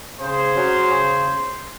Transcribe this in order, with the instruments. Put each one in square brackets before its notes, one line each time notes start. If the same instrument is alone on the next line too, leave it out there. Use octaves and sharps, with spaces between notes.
[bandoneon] C#3 [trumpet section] G#4 C5
[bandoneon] F#3 C#4 F#4 C#5
C#3